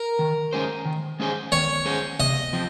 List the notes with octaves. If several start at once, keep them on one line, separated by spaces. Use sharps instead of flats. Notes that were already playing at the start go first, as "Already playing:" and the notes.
Already playing: A#4
D#3
G#3 C#4 G#4 C5
D#3
G#3 C#4 G#4 C5
D#3 C#5
G#3 C#4 G#4 C5
C3 D#5
F3 C4